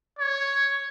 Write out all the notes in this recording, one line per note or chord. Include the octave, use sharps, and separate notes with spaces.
C#5